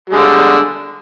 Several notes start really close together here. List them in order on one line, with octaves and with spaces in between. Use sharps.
G3 G#3 D3